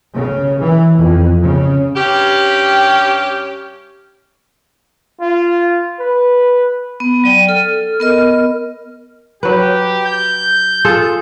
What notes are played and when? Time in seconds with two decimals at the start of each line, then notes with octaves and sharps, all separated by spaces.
0.14 C#3
0.61 E3
0.98 F2
1.42 C#3
1.96 G2 C#4 G4
5.21 F4
6.00 B4
7.00 B3
7.24 F#3 D5 G5 D#7
7.49 A4 F6
8.00 B3 A#4 D#5
9.43 F#3 G4 B4
10.06 G6
10.85 F4 G#4 A4